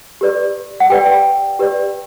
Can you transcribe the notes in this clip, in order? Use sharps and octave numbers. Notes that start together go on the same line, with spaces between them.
G4 B4 D5
F#5
G4 B4 D5 G5
G4 B4 D5